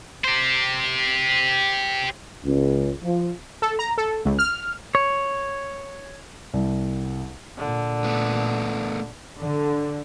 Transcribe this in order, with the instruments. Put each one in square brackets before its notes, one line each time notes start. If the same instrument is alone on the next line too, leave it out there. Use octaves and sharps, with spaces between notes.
[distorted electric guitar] G4 C5
[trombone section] C#2
F3
[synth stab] A4
A#5
A4
C#2
F6
[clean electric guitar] C#5
[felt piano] C2
[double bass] A#2 [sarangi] D3
[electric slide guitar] A3 B3
[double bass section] D3